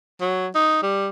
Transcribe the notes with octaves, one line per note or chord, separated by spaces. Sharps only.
F#3
D#4
G3